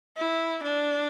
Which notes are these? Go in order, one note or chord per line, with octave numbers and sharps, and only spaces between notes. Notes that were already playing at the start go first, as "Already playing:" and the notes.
E4
D4